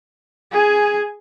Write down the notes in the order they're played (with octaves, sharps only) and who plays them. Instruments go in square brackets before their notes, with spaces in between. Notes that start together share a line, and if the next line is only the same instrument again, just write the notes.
[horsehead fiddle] G#4 G#5